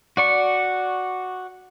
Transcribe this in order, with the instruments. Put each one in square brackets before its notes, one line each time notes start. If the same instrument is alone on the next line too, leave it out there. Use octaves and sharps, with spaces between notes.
[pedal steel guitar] F#4 D5 C#6